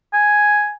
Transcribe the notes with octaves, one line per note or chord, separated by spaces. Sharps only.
G#5